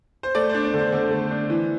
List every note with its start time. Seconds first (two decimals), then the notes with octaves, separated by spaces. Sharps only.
0.23 C5
0.35 A3 D5
0.49 C5
0.54 D4
0.64 D5
0.74 D3 C5
0.92 D3
1.11 A3
1.31 D4
1.50 E3